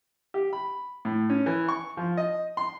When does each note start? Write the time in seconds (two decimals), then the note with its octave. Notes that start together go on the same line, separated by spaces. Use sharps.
0.34 G4
0.53 B5
1.05 A2
1.30 C#4
1.46 E3
1.69 C#6
1.97 F3
2.17 D#5
2.57 C6